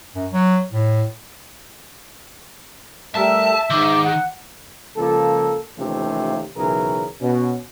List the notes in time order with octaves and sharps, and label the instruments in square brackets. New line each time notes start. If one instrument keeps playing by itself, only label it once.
[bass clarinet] F#2
F#3
A2
[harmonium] G3 A3 A#4 [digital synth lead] E5 [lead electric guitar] A5
[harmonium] G#2 [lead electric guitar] D#3 [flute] D6
[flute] F#5
[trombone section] C#2 F3 A#3 A4
D#2 C3 E3 F3 A3 C#4
B1 C#3 E3 C#4 G#4 A#4
B2 C#4